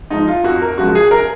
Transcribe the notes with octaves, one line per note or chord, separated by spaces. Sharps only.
G#2 F3 G#3 D#4
F4
F2 F#4
A#4
C#3 F3 G#3 F#4
G#4
A#4